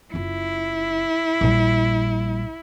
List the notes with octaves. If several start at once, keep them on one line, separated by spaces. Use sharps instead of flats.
F#1 E4 F4
A#1 G3